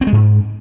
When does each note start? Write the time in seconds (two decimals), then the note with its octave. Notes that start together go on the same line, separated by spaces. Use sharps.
0.01 C4
0.07 G#3
0.13 G#2